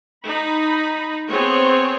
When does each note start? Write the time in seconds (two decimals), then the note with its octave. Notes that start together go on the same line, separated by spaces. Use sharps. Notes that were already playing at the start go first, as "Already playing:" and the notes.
0.24 D#4 B5
1.31 B3 C4 G#4 C#5